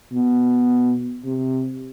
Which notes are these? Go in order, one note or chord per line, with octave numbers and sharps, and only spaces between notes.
B2
C3